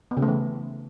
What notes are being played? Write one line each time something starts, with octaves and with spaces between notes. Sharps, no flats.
B3
C#3
A3
E3